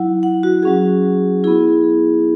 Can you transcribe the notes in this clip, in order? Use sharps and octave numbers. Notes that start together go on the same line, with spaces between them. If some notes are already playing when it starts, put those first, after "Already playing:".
Already playing: F#3 E4 F#5
F#5
F#4
F#3 C#4 F#4 G#4
B3 E4 G#4